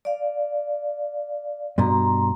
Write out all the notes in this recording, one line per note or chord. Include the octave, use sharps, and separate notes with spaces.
D5 F5
G2 B2 A#5 C6